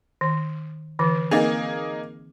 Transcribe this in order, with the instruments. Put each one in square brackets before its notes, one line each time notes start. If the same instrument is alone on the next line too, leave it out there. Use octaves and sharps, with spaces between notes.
[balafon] D#3
D3 E3
[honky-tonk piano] A#3 D#4 G#4 [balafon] C4